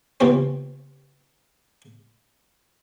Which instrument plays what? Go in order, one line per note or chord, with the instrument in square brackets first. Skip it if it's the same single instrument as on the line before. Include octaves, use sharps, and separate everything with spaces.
[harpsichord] C#2 A#2 E3 B3 G4 C5